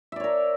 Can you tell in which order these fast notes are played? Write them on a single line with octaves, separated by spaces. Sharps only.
E5 D5 C#5 A#4